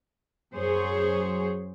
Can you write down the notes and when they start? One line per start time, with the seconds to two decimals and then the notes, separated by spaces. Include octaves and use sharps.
0.55 F#2 F#3 G#4 C5 C#5